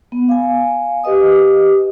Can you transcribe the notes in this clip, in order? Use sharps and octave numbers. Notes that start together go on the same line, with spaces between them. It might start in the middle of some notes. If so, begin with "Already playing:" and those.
B3
F5 G#5
G4 B4 D#5 D#6